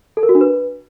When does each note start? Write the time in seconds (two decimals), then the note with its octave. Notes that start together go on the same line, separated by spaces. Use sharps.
0.17 A4
0.23 A#4
0.29 F#4
0.35 D4
0.41 B4